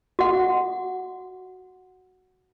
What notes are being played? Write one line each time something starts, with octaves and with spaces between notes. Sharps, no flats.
F#4 F#5